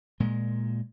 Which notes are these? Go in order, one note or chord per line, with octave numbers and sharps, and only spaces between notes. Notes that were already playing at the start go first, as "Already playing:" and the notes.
A#2 G#3